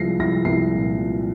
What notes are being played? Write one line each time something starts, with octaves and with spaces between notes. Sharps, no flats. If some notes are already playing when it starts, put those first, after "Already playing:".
Already playing: C2 F3 G#3 A#6 C7
C2 A#6
C2 C7
A#2
F3